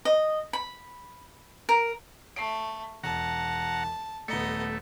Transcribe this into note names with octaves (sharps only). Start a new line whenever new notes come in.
D#5
B5
A#4
A3 C7 D7
E1 F#5 A5 A#5
D#1 A3 B3 D#5 A#5 C#7